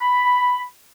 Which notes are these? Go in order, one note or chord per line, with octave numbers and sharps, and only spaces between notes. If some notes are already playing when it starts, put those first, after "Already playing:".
B5